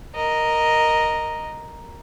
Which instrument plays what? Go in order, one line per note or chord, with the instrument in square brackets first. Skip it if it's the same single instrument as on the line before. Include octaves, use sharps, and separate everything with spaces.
[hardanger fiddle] A#4 D#5